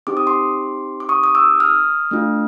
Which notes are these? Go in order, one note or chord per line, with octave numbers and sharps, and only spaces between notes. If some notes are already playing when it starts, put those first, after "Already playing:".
C4 D#4 G4 D6
D#6
C6 D6
D6
C#6 D#6
D#6
D6 E6
D#6 F6
A3 D4 F4